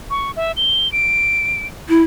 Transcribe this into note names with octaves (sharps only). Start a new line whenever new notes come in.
C#6
E5
G7
D7
E4